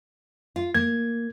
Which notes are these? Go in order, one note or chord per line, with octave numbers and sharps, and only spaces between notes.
F4
A#3 G#6